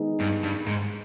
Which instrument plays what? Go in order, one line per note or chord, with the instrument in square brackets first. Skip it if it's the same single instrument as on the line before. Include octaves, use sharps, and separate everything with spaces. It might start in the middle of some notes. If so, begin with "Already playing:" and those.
Already playing: [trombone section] D#3 G#3 B3 D#4 G#4
[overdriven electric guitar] G2
G2
G#2